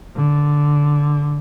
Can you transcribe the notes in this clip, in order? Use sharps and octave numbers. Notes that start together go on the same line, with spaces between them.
D3